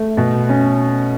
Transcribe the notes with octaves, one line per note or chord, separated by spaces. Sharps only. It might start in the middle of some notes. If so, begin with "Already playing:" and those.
Already playing: A3
B2
C#4